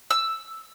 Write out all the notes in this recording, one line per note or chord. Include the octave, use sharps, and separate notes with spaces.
E6